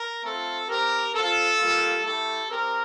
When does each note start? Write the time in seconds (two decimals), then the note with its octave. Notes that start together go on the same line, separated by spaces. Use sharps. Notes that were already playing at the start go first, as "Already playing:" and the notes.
Already playing: A#4
0.23 A3 C4 F4 A4
0.68 C4 G4 A#4
1.13 C4 F4 A4
1.58 G3 A#3 F4
2.04 A3 E4 G4 A4
2.49 C4 G4 A#4